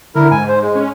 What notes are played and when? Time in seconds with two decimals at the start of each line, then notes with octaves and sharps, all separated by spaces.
0.15 D3 E4 A#4
0.31 G#2 G#5
0.48 C5
0.61 G#3
0.75 C#4